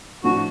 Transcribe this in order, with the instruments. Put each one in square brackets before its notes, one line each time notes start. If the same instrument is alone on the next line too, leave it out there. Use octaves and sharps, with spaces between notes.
[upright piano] A2 F3 A3 D4 [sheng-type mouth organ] F#4